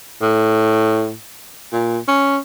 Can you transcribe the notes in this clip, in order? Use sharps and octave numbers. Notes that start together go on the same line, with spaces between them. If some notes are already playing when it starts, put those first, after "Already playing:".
A2
A#2
C#4